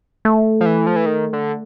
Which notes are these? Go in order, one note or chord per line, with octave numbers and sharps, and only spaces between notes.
A3
F3
E3
F3
E3
D#3
D3